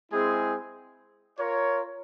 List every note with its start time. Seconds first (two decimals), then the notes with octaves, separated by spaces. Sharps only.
0.11 G#3 C4 E4 G#4
1.38 F4 A#4 C#5